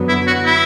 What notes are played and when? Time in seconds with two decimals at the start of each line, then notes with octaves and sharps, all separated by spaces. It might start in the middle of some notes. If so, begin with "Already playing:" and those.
Already playing: F#2 D3 F#3 B3
0.08 E4
0.27 F#4
0.45 E4